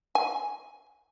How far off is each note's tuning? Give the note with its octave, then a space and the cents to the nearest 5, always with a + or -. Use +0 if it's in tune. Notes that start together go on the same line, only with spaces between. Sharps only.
G#5 -5